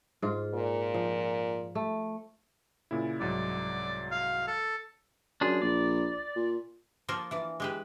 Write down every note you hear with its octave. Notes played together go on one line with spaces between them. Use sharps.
G#2 F4
A#2
F3
A3
A#2 C#3 E4
C2 G#2 F#3 D5
F5
A4
F#2 D4 F4 G#4
A#1 D5
A#2
F3 A#3 F4 A4 A#4
E3 D5
G#3 G4 B4